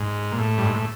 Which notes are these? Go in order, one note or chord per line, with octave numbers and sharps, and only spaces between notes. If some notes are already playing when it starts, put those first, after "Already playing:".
Already playing: G#2
A#2
A2
G2
G#2
A2